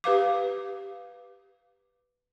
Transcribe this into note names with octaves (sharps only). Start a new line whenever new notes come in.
G4 B4 F5 D6